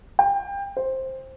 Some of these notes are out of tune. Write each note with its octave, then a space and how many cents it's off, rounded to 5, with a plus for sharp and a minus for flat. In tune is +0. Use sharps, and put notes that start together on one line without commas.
G5 +25
C5 +10